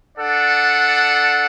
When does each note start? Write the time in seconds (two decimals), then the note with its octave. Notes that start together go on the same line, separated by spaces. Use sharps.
0.18 D4 A4 D5 F#5